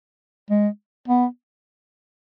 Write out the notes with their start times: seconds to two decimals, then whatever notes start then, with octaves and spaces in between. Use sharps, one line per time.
0.50 G#3
1.08 B3